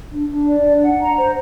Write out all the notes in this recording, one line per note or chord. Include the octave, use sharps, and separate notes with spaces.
D4
D4
D5
D4
F#5
A#5
C5